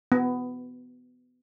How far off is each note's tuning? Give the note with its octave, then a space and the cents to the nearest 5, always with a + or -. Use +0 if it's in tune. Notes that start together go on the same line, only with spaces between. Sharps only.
B3 +15